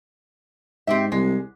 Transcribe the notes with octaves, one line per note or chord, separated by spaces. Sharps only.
G#2 C4 G4 E5
C2 G#3